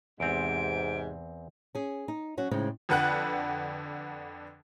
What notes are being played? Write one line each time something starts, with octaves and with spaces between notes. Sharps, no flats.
E2 G#2 C3 C4 D7
C#4 G#4
D#4
F#3 C#4 F#4
A2 C#3 G#3 C4 D#4
F2 D3 B4 F#5 G5 F#6